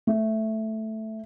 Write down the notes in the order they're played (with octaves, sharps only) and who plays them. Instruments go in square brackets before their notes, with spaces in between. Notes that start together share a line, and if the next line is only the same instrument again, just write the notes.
[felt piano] A3